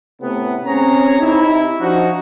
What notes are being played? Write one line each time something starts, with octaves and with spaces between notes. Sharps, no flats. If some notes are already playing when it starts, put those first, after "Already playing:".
A2 C3 B3
C4 C#4 G#4 C#5 A#5
C3 D#4 E4
F3 D4 D#4 F#4